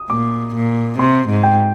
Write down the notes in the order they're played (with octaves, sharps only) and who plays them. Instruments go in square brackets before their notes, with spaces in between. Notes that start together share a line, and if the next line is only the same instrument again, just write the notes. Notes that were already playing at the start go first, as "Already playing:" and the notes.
Already playing: [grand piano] D#6
[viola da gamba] A#2 [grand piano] D6
[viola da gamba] A#2
[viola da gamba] C3 [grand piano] C6
[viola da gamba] G#2
[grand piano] G5